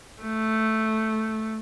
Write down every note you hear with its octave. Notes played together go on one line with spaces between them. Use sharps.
A3